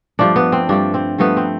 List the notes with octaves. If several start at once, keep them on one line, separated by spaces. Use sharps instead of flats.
G2 F3 A3 D4
B3
C4
G2 F3 A3 D4
C4
G2 F3 A3 B3
C4